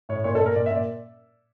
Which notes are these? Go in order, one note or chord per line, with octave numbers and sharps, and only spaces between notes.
A2 C#5
A#2 C#5
A4
A#2
A#4
A#2 D5
E5
A#2
D5